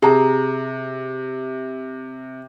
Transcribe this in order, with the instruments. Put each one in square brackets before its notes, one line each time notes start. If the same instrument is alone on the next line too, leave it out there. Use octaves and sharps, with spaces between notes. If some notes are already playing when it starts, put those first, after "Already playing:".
[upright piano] C3 [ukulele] G#4 A#5